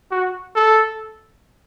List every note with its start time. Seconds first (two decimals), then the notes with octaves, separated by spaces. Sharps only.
0.11 F#4
0.56 A4